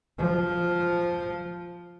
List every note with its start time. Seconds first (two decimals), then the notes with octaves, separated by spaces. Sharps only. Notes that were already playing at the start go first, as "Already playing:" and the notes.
0.18 F3